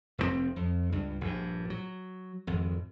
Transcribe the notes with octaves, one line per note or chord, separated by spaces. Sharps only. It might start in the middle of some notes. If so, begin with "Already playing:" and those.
F1 D#2 C3 C4
F2
C#2 G2
A#1 G2
F#3
G#1 F2